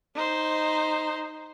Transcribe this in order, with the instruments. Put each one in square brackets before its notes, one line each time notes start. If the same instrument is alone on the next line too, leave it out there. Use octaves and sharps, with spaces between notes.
[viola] D#4 C5